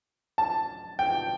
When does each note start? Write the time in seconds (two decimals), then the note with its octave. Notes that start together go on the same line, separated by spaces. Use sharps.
0.38 A5
0.99 G5